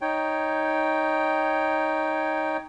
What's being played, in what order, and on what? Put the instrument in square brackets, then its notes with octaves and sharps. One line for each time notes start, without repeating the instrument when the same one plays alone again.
[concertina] D#4 C#5 G5